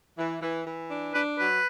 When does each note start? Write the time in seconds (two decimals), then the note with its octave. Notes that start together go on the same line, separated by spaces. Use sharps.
0.17 E3
0.41 E3
0.66 E3
0.90 D4
1.14 D4 B4
1.38 F#3 B4